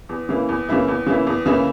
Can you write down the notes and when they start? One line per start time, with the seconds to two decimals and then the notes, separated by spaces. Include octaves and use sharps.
0.09 E2
0.29 C#3 E3 A#3 E4
0.49 E2
0.69 C#3 E3 A#3 E4
0.88 E2
1.06 C#3 E3 A#3 E4
1.27 E2
1.46 C#3 E3 A#3 E4